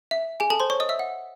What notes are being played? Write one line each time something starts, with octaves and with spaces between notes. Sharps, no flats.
E5
G#4 G#5
A4 A5
C5 C6
C#5 C#6
D#5 D#6
E5 E6
F#5